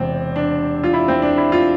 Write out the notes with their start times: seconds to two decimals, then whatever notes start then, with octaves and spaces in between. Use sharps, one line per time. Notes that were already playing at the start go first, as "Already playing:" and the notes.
Already playing: E1 E2 C3 C4
0.36 D4
0.83 F4
0.93 E4
1.08 C4
1.22 D4
1.37 E4
1.52 F4